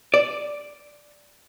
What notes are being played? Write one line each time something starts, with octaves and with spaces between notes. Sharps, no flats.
D5